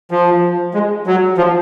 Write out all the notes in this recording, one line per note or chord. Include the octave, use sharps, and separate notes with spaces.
F3
G#3
F#3
F3